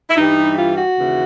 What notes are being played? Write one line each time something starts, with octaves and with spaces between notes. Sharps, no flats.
E4
G2 E3 G3 D#4
F4
F#4
D#2 C#3 E3